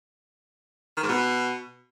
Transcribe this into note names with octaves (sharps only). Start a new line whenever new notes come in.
D#3
G#2
B2